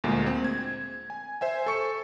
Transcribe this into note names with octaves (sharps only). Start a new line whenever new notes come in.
D2 A#2 G#3 A#3
C4
G#6
G#5
C5 E5 G#5
A4 C#6 C#7